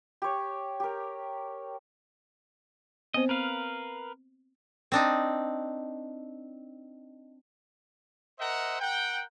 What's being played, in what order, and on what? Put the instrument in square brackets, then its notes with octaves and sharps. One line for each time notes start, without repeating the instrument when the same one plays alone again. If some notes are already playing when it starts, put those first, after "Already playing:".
[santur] G4 C#5
G4 A#4
[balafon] B3 C4 C5 [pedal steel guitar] D#5
[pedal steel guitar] A#4 B4 F5
[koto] C4 D4 D#4
[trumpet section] A#4 C5 D#5 E5 F#5
A#4 F#5 G5